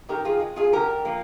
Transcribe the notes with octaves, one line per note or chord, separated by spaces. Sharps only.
D#3 G4 A#4
F4 G#4
G#3
F4 G#4
D3 G4 A#4
F3 A#3